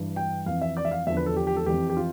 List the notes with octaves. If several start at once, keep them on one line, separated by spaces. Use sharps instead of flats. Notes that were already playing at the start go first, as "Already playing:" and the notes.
Already playing: G2 E3
G5
F2 E3 F5
E5
D5
E5
F5
E2 D3 F3 E5
B4
A4
G4
G4
A4
F2 E3 G4
G4
F4